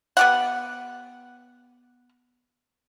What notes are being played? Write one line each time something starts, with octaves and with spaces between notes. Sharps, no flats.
B3 G4 F#5